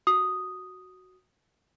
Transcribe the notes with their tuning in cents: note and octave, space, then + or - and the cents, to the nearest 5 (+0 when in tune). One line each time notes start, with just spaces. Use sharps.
F#4 +0 D#6 +0